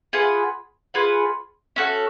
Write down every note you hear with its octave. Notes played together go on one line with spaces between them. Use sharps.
F4 G#4 B4 F#5
F4 G#4 B4 F#5
C#4 F#4 A4